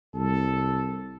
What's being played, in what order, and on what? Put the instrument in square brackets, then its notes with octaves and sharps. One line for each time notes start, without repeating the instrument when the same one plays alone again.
[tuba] C2 [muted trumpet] A4